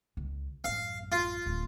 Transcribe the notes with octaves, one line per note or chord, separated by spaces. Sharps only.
C#2
A1 F#2 F5
F4
D1